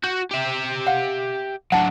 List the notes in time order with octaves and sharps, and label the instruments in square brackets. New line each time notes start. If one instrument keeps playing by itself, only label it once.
[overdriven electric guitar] F#4 [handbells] G6
[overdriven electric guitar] G4 E5
[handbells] F5 F#5
[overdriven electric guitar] F#3 D4 [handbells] F#5 A5